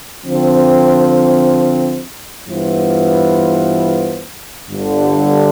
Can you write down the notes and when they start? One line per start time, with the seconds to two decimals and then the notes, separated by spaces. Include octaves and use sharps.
0.25 D3 F3 C4
2.47 G2 E3 B3 F4 C5
4.69 G1 G2 D3